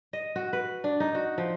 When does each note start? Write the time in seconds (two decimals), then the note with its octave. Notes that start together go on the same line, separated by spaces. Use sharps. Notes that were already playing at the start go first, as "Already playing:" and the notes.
0.13 D#5
0.36 F#4
0.53 B4
0.84 D4
1.00 D#4
1.15 F#4
1.38 F3